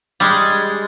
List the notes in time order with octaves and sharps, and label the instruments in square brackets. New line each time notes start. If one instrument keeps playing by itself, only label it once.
[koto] G3 G#3